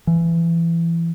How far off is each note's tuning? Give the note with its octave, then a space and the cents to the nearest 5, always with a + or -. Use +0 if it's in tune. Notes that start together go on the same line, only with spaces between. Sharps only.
E3 +25